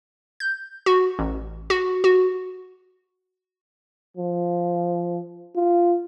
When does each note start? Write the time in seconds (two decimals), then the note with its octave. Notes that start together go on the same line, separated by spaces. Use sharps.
0.40 G6
0.86 F#4
1.19 A1
1.70 F#4
2.04 F#4
4.17 F3
5.56 F4